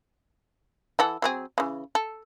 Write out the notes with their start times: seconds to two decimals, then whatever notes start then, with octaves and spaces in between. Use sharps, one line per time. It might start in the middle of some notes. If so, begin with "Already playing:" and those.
0.99 E3 A4 F#5
1.22 F#3 C4 G#4
1.58 C#3 E3
1.95 A4